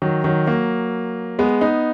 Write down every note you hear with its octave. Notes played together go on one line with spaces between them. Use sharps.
D#3 F#3
D#3 F#3
F#3 A#3
G#3 B3
B3 D#4